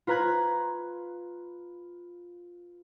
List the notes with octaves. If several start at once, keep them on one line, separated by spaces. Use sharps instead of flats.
F4 B4 A#5 F#6 G#6